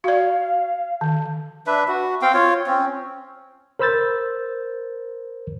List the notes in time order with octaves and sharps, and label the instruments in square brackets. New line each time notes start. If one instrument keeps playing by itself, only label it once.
[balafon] F#4 D5 [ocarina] F5
[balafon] D#3
[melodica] D4 B4 E5
F#4
C4 F5 G5
F4 C#5
C4 C#4
[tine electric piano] A#4 C5 B5 E6 G6 A6